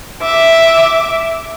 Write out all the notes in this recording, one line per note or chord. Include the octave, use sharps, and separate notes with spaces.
E5 D6